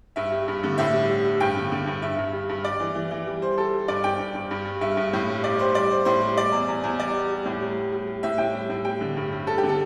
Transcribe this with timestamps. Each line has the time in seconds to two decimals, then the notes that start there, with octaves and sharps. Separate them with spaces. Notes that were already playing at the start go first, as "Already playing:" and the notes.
0.16 G2 E5
0.32 G3
0.48 G2
0.63 D3
0.78 A2 E5
0.94 G3
1.09 G3
1.25 G3
1.40 G2 G5
1.56 D3
1.71 D3
1.87 G2
2.02 G2 E5
2.18 G2
2.33 G3
2.49 G2
2.64 G3 D5
2.80 E3
2.95 E3
3.11 E3
3.27 G3
3.42 G3 C5
3.57 G3 A4
3.73 G3
3.88 G2 D5
4.04 G2 G5
4.19 G2
4.35 G2
4.51 G2
4.66 G3
4.81 G2 E5
4.97 G2
5.13 A2
5.29 G3
5.44 G3 D5
5.59 G3 C5
5.74 G3 D5
5.91 G3 C5
6.05 A2 C5
6.22 G3
6.36 G3 D5
6.52 E2
6.68 E2
6.84 E2
6.98 G3 D5
7.14 G3
7.29 G3
7.46 A2
7.61 G3
7.77 G3
7.92 G3
8.07 G3
8.23 A2 E5
8.38 A2 G5
8.55 G3
8.70 A2
8.85 G3 G5
9.01 D3
9.17 G2
9.32 G3
9.47 G3 A4
9.58 G4
9.63 D3
9.69 A4